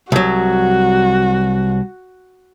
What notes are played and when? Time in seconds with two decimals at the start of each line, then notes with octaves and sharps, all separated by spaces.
0.12 C2 F#3 F#4